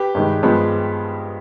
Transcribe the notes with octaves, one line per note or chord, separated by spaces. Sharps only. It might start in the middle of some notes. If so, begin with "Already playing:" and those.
Already playing: G4 B4
G2 D#3 G#3
G2 F3 G#3 B3